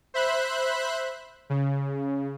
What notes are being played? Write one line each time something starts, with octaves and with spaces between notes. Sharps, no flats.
C5 E5 B5 F#6
C#3